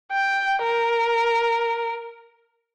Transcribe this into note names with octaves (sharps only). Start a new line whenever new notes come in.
G5
A#4